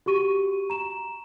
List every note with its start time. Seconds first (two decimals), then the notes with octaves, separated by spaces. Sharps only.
0.06 F#4 G4 C#6 D#7
0.70 A#5 E7